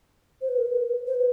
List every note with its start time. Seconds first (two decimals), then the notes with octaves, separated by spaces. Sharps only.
0.41 C5
0.49 B4
0.58 A#4
0.66 B4
1.07 C5
1.15 B4